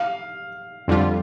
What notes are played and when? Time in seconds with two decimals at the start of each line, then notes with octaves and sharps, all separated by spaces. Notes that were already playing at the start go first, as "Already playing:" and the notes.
Already playing: F5
0.88 F2 D3 G3 F4